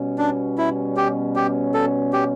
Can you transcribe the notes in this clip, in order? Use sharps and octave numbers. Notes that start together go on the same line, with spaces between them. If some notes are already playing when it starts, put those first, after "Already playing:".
Already playing: B2 G3 C#4
D4
E4
G4
G4
A4
G4